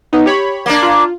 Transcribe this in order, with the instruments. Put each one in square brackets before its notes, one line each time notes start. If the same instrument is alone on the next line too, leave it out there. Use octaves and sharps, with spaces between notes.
[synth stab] B3 D#4
G4 C#5 B5
[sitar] A#3 D4
[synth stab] F4